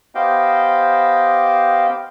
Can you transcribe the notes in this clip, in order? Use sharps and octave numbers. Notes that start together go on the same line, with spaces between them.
B3 G4 C5 D#5 F5 G5